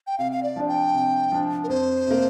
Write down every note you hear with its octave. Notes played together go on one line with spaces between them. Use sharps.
G5
C3 F5
F5
D5
F3 D4
G5
C3
F3 D4
A#4
F2 C5
C3 A#3